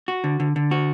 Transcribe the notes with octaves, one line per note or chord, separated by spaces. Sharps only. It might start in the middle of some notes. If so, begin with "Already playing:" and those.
F#4
D3
D3
D3
F#4